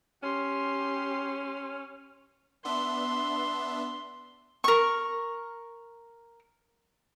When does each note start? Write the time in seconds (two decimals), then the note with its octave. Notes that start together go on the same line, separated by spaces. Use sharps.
0.23 C#4 G4 C6
2.65 B3 D4 E5 C6
4.64 A#4 C#6